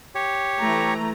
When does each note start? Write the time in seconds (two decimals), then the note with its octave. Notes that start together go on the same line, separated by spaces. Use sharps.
0.15 G4 C#5
0.60 E3 A3 A#5